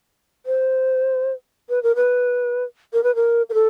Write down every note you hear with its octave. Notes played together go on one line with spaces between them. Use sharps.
C5
B4
A#4
B4
A#4
B4
A#4
A#4
A4